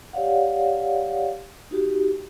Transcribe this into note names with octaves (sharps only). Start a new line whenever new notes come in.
G4 C#5 D5 F5 F#5
D#4 F#4 G4